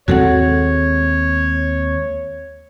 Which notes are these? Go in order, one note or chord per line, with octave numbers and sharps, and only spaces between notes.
D#2 G#3 C4 F#4 A4 C#5 F#5